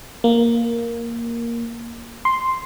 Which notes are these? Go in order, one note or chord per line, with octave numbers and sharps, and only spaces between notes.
A#3
C6